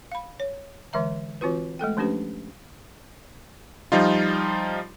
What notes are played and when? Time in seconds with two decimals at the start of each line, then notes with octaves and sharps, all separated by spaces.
0.12 F5 B5
0.40 C#5
0.93 D3 E3 G#3 E5 A#5
1.41 E3 C4 F4 F#4 B4
1.79 G#3 A3 A4 G5
1.97 F3 A3 C#4 D4 G4 B4
3.92 F3 G3 D#4 F4